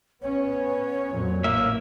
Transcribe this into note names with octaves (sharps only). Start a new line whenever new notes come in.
B3 C#4 C#5
F2 A#2 F#3
A1 A#3 E5